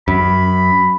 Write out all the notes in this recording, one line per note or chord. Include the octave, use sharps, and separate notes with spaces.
F#2 B5